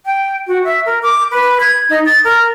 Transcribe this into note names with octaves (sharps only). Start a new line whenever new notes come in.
G5
F#4
E5
A#4
D6
B4
G#6
D#4
A6
A#4